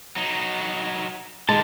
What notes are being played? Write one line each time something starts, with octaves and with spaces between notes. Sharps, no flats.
F#3 D#4
D3 D#3 G#3 A5